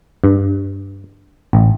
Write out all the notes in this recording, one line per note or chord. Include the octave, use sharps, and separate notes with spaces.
G2
A1